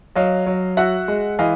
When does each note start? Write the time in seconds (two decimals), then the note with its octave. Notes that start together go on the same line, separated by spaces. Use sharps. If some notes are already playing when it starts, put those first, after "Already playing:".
0.15 F#3 D#5 F5
0.46 F#3
0.77 F#4 E5 F#5
1.08 G#3
1.39 E3 D#5 F5